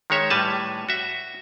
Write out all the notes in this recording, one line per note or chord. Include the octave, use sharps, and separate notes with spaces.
D#3 G#3 C#5 E5
A2 G3 B4 G#5 A5
F#4 E5